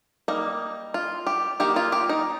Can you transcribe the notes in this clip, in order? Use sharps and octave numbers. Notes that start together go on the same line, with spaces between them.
G3 A#3 D#4
F4
G4
D#3 A#3 D#4 G4
F4
G4
D#4